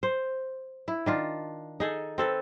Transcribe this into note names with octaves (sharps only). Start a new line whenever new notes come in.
C5
E4
D#3 D4 F4
D#4 G#4 A4
C4 A4 B4